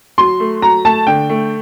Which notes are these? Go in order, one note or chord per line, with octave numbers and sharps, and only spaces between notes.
F#3 C6
A3
F#3 A#5
A3 A5
D3 G5
A3